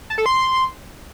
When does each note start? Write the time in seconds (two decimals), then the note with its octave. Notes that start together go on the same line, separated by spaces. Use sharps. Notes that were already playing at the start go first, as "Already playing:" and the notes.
0.10 A5
0.18 A4
0.26 C6